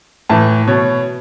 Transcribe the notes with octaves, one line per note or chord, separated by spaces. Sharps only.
A2 E3 A5
B2 C#5